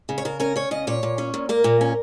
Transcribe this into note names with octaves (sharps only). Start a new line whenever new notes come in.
C#3
C#5
C#3 A#4
C#4 A#4
C#4 C#5
C#3 D#5
A#2 C#5
A#2
C#4
A#2
A#3 A#4
A#2
C#4